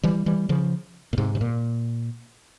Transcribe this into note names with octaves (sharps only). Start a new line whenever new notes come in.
E3 G3
E3 G3
C#3 F3
A#2
G#2 C3
C3
A#2